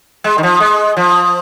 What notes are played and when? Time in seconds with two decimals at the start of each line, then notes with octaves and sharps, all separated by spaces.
0.24 G#3
0.38 D#3
0.43 F3
0.60 G#3
0.97 F3